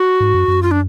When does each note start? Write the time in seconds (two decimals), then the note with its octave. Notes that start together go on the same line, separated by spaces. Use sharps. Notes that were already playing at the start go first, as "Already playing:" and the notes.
Already playing: F#4
0.20 G#2
0.34 F#2
0.48 F#2
0.63 F4
0.71 D4